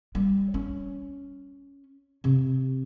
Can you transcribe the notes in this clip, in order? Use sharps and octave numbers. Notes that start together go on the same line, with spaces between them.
G3
C#4
C3